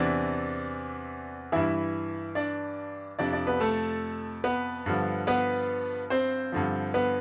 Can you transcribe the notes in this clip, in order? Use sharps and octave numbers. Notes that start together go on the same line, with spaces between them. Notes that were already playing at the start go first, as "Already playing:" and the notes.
Already playing: E2 C3 E3 D4 D5
G2 E3 E4 E5
D4 D5
F2 C3 F3 D4 D5
D4 D5
B3 B4
A3 A4
B3 B4
G2 D3 F3
B3 B4
C4 C5
G2 D3 F3
B3 B4